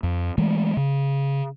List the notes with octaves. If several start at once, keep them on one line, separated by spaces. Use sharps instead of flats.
F2
E3 G#3 A3
C#3